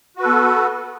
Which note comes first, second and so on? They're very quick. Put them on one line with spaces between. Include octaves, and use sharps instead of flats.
F#4 B4 A4 B3